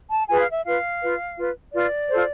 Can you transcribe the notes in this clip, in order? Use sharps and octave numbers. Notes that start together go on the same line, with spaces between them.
A5
F4 G#4 B4 G#5
F5
E5
F4 B4 F5
F4 B4
F4 B4
F4 B4 D5
F4 A4 C5